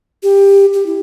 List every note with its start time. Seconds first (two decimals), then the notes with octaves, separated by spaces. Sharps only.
0.23 G4
0.73 G4
0.86 E4